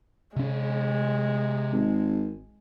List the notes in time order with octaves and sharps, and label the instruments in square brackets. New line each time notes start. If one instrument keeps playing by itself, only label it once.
[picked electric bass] C3 C#4 [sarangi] G#3
[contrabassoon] G#1